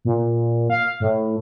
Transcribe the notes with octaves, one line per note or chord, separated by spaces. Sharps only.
A#2
F5
A2